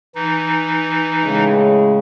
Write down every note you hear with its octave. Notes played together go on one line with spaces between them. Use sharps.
E3 D#4
A2 C#3 G#3